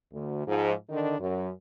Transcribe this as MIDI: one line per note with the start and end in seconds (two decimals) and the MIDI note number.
0.13 0.44 38
0.46 0.72 44
0.46 0.72 53
0.90 1.15 50
0.90 1.15 51
0.90 1.15 62
0.90 1.15 63
1.19 1.49 42